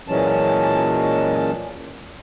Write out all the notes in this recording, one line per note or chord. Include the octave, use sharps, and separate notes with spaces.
A#2 E3 F#3 G#3 C#4 A5